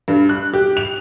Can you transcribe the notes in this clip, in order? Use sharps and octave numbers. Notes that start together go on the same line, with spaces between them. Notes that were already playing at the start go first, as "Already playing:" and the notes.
G2
F#6
G4
F7